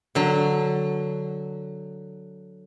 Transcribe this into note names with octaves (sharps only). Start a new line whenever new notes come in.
D3 F#3